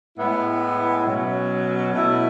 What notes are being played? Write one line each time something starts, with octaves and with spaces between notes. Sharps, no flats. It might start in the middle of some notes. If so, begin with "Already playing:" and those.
A2 G#3 B3 E4
B2 F#3 C#4
B2 A3 E4